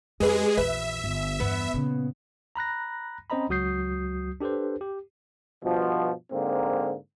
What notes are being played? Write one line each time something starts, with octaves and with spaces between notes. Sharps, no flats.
F2 G#3 G4 G#4 B4 D#5
A#1 E2 B4 E5
G1
E2 G2 B3
A#2 C#3
A#5 B5 F#6 A#6
C4 C#4 C5 D#5 A#5 B5
C#2 F#3 F#4 D#6 G6 C7
D4 G4 A4 B4 C5
G4
G2 B2 F3
G#2 D3 A#3 C4